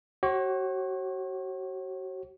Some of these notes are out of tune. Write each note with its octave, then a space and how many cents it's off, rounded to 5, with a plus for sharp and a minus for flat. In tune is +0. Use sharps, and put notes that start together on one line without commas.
F#4 +35 C#5 -40